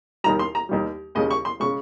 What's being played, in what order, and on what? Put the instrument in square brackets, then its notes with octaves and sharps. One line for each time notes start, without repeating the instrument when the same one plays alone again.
[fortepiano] D#2 D#3 G3 A#5
C6
A#5
D#2 D#3 G3
D#2 C#3 G#3 D#5
C#6
C6
C#3 G#3 C#6